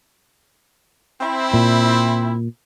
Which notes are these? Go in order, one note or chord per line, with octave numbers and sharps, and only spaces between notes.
C4 E4
A#2